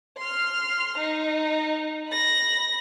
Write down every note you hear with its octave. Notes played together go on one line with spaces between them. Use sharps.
C6 F6
D#4
B5 A#6